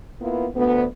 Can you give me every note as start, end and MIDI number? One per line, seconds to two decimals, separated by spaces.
0.21 0.47 58
0.21 0.47 59
0.21 0.47 64
0.21 0.47 65
0.21 0.47 71
0.55 0.84 38
0.55 0.84 59